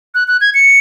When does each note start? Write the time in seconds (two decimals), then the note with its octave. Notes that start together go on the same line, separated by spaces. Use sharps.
0.15 F#6
0.28 F#6
0.41 G#6
0.54 C#7